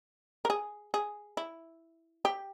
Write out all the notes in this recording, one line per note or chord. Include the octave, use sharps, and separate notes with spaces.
A#4
G#4
G#4
E4
G4